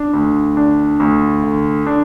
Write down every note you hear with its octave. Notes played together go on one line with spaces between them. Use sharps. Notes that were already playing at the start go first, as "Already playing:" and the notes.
Already playing: D4
D2
D4
D2
D3
D4